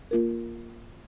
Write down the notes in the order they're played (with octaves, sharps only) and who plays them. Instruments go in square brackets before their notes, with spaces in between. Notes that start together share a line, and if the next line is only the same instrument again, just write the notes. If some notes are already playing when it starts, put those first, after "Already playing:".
[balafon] A#3 F4 A#4